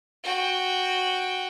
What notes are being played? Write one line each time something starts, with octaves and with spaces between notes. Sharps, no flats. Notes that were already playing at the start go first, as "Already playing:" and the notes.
F#4 G5